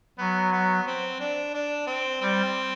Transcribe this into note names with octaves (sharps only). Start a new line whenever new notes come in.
F#3 B3
B3
C4
D4
D4
C4
G3 C4